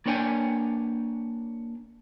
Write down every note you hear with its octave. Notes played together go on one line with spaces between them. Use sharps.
A#3 D4 B4 C#5 G5 G#5